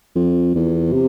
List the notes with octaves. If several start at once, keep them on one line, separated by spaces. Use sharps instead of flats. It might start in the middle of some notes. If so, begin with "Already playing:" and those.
F2
E2
C3